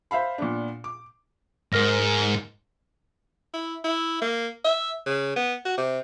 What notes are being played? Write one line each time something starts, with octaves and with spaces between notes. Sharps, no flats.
C5 E5 F5 B5
A#2 B3 D4
D6
G#2 A#4 F6 A#6
E4
E4
A#3
E5
C#3
B3
F#4
C3